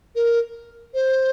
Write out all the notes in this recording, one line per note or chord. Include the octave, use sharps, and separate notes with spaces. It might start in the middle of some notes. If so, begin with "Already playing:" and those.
A#4
C5